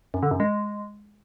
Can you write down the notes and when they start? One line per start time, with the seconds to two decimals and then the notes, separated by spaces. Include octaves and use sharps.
0.14 F#2
0.23 D3
0.31 F#2
0.40 G#3